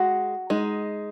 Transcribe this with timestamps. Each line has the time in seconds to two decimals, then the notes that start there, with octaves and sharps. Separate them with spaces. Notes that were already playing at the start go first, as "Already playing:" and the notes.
Already playing: G#3 F#4
0.50 G#3 D#4